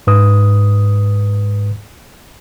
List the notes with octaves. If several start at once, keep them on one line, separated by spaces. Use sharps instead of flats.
G#2 B4 D#6